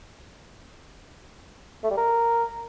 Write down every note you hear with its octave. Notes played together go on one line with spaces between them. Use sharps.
A3
G3
A#4